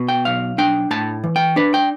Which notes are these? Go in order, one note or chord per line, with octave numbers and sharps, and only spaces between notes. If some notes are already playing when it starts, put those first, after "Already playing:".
Already playing: B2
G5
B1 F5
D4 G5
A2 A5
E3
G5
D4 B4
G5